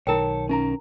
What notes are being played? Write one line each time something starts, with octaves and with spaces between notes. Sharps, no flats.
B1 D#3 E4 A#4 C#5 G5 A5
C#4 D#4 E4 A#4 A#5